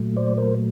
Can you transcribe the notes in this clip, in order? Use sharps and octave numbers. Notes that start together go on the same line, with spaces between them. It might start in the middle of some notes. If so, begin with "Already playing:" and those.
Already playing: A#2 F#3 A3
C5 D5
A#4 C5